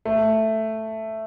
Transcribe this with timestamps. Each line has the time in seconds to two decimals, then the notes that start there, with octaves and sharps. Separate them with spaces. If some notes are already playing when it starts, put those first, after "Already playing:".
0.05 A3